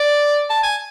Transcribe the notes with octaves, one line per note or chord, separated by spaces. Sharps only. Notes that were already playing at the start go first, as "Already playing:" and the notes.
Already playing: D5
A5
G#5